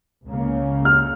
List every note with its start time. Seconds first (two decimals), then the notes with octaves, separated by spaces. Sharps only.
0.28 C#2 C#3 A#3 C#4
0.85 F6